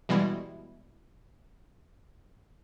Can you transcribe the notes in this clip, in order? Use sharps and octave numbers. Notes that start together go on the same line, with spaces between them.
B2 E3 G3 G#3 B3 E4